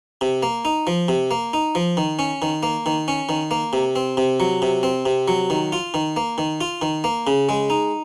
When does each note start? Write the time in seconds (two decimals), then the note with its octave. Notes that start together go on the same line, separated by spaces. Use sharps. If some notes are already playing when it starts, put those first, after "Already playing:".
0.21 C3
0.43 A#3
0.65 D#4
0.87 F3
1.08 C3
1.31 A#3
1.53 D#4
1.75 F3
1.97 D#3
2.19 C#4
2.42 D#3
2.63 A#3
2.86 D#3
3.08 C#4
3.29 D#3
3.51 A#3
3.73 C3
3.96 C4
4.17 C3
4.40 F#3
4.62 C3
4.83 C4
5.06 C3
5.28 F#3
5.50 D#3
5.72 F4
5.94 D#3
6.17 A#3
6.38 D#3
6.61 F4
6.82 D#3
7.04 A#3
7.27 C#3
7.49 G#3
7.70 D#4